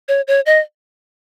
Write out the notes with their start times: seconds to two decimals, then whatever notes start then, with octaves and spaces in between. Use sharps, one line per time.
0.08 C#5
0.28 C#5
0.46 D#5